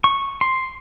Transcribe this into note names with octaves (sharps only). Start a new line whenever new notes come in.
C#6
C6